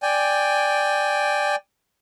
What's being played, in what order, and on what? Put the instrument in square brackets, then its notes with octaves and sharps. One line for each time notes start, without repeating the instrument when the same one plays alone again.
[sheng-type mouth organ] D5 G5 G#5